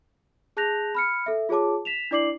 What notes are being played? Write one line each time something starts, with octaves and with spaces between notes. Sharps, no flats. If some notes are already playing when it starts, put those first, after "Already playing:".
G#4 A5 F#6 G6 A#6 F7
B5 F6 C#7
A4 E5
F4 G#4 C#5 A5 D6
B6 E7 F7
D4 E4 D5 D6 C7 F#7